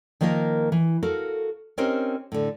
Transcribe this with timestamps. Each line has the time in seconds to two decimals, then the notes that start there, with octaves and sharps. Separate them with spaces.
0.21 D#3 F3 A#3 F4 A#4
0.72 E3
1.03 F#4 A4 A#4 F5
1.78 C4 C#4 D#4 G4 A#4 C5
2.32 A2 D3